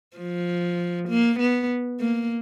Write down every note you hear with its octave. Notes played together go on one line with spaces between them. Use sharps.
F3
A#3
B3
A#3